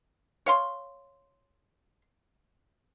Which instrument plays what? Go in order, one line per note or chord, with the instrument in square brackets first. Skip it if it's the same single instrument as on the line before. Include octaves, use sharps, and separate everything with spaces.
[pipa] C#5 F5 C6